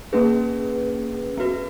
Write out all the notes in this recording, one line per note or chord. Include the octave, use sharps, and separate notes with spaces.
A#3 C#4 G#4 B4
B3 F#4 B4